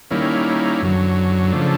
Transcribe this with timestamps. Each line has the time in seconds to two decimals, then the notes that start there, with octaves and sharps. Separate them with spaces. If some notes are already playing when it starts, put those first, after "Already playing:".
0.11 D#3 G3 A#3 C#4 E4
0.82 F#2 D3 F#3
1.52 C#3 F3 A3 D4